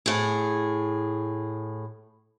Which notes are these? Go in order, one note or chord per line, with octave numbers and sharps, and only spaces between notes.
A2 G#4